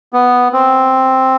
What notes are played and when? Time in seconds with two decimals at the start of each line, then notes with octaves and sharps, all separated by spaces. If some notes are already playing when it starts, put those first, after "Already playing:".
0.13 B3
0.53 C4